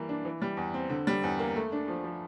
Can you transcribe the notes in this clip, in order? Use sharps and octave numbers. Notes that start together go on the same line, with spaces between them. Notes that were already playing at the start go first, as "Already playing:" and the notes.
Already playing: E3 G3 A#3
D4
E3
G3
E2
C4
D3
G3
E2
A#3
A3
D4
F3
F3